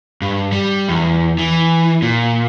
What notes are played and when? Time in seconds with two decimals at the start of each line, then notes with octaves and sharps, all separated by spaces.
0.22 G2
0.52 G3
0.89 E2
1.38 E3
2.02 A#2